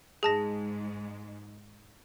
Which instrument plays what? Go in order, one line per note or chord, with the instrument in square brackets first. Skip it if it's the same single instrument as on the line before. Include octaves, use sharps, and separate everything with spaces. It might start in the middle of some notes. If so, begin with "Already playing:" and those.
[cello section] G#2 G#3 [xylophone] G#4 A5 A#6